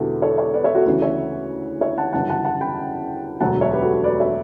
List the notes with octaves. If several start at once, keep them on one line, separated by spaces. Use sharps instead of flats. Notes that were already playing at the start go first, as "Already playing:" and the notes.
Already playing: E1 E2 D3 E4 F#4 G4 A4
A4 C#5
A4 C#5
B4 D5
C#5 E5
F#4 A4
D2 C#3 E3 F#4
C#5 E5
C#5 E5
F#5 A5
G1 F#2 C#3 E3 F#5 A5
F#5 A5
F#5 A5
G5 B5
E1 D2 D3 F#3 F#5 A5
C#5 E5
G4 B4
F#4 A4
F#4
B4 D5
C#5 E5